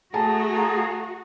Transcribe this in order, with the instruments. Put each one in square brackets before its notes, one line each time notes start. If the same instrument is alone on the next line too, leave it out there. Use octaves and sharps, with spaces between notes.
[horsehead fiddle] A3 A#5 [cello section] F#4 [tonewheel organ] G#4 [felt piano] A5